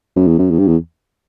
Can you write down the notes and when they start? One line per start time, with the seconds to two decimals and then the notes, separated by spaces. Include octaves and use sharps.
0.16 F#2
0.27 E2
0.39 F#2
0.51 E2
0.59 G2
0.68 E2